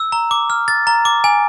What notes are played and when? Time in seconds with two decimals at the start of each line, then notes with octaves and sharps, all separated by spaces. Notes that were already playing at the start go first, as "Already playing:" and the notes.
Already playing: E6
0.12 A#5
0.31 D6
0.50 F6
0.68 A6
0.87 A#5
1.05 D6
1.24 G#5